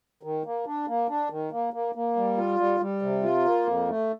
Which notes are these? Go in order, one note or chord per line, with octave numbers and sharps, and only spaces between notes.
D#3
A#3
D4
A#3
D4
D#3
A#3
A#3
A#3
G3
F4
G3
G3
C3
F4
A#3
F2
A3